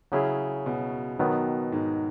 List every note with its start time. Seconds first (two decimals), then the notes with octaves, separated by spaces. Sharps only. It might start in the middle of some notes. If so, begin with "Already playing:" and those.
0.12 C#3 F#3 C#4 E4 G#4
0.66 B2
1.19 B2 D#3 F#3 B3
1.72 G#2